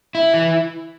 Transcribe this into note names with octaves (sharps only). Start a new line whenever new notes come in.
E4
E3